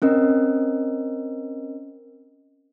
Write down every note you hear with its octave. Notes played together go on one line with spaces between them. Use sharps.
C4 C#4 A#4 D#5